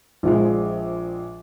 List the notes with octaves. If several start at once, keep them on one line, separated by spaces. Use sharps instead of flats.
A#1 F3 G#3